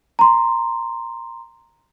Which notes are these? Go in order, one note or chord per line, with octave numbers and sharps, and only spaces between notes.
A#5 C6